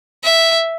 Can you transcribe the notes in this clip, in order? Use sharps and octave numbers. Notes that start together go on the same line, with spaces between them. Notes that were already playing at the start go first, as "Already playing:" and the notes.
E5